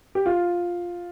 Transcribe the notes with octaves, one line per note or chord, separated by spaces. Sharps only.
G4
F4